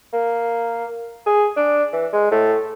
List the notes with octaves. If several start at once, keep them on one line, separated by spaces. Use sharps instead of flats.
A#3
G#4
D4
E3
G#3
A2